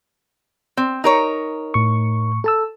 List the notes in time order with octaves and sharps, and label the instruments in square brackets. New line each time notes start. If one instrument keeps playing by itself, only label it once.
[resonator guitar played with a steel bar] C4
D#4 A#4 C#5
[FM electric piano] A2 C#6
A4 A5 E6